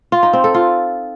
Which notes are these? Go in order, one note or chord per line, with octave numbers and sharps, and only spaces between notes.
F4
D#4
C4
A4
F4